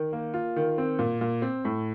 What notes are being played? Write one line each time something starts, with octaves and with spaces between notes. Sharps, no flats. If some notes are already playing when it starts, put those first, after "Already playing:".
Already playing: D#3
A#3
F4
D#3
C4
A#2
A#2
C4
A2